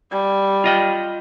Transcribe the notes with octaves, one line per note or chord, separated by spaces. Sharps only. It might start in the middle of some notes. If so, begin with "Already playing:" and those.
G3
F4 D#5 G5